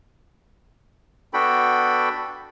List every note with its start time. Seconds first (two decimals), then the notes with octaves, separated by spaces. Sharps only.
1.34 B3 D4 F#4 A4 G5 B5